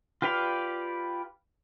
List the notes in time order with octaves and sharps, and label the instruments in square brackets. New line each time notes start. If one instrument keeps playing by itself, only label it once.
[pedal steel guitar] F4 G4 B4 D5 F5